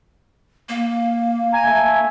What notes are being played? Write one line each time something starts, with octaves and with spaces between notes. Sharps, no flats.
A#3
G#5 A#5
A3 E5